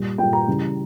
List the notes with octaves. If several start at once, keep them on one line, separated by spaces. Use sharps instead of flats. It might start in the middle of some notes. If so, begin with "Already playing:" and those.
Already playing: A#2 G3
A#2 G3 G5
A#5
C#3 E3 G3